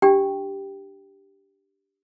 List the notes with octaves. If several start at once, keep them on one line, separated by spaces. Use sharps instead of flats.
D4 G4 G5